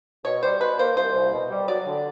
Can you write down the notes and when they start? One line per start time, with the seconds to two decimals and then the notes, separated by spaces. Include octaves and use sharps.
0.25 B2 C#5
0.43 G3 C5
0.60 B2 B4
0.79 A#3 C5
0.97 C2 C5
1.15 C2
1.32 B2
1.51 G3
1.68 F#3 D5
1.87 D3